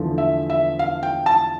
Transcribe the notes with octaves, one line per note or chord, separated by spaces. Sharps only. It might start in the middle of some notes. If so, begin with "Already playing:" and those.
Already playing: E2 D3 F3 A3
E5
E5
F5
G5
A5